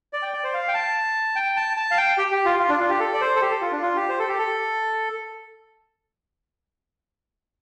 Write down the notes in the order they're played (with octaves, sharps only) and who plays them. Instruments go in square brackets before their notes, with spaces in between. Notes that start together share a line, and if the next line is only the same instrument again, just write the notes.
[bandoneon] D5
G5
D5
C5
F5
G5
A5
G5
A5
A5
F5
G5
G4
G4
F4
F4
D4
F4
G4
A4
D5
C5
A4
G4
A4
F4
D4
F4
G4
C5
A4
G4
A4